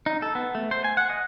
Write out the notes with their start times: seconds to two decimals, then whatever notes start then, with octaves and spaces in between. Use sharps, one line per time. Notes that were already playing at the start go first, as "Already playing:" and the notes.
0.06 D#4
0.22 A4
0.35 B3
0.55 A3
0.71 C5
0.84 G#5
0.97 F#5
1.10 D#5